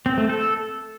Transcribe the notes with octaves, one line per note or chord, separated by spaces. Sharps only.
C4
A3
A4